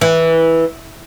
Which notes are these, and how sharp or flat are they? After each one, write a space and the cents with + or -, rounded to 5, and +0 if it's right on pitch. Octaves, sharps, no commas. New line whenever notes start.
E3 -10